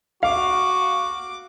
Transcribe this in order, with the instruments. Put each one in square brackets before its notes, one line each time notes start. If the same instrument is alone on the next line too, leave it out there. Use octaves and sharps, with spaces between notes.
[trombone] F#4 [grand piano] F5 [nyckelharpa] D6